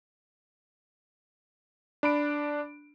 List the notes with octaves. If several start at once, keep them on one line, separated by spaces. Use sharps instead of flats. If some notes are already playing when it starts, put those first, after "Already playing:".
D4 B5 D7